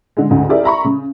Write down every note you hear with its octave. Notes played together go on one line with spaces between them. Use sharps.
D3 G#3
D2 G#2 C#3
E4 G4 G#4 A#4 D5 E5
E5 A#5 B5 C#6
C#3